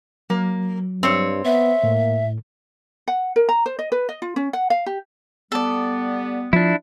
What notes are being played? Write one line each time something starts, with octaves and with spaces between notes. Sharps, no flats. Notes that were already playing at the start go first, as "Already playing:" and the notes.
F#3 A#3
G2 C4 C#5
B3 E5
A2 A#3
F#5
A#4
A#5
C5
D#5
B4
D#5
F4
C#4
F#5
F5
G4
G3 B3 A4 D5
F3 D4 E4